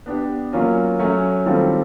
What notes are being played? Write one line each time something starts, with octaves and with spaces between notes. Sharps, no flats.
B3 D4 G4
F#3 A#3 C#4 F4
F#3 A3 C#4
D#3 G3 C4 F4 A4